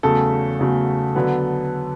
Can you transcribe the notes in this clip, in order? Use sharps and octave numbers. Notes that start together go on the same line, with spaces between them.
E2 C#3 F#3 A3 A4
E2 C#3 F#3 A3
D3 F#3 B3